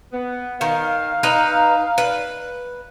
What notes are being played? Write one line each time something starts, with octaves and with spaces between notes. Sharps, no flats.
B3
D#3 F5
D#4 B4 A#5
B4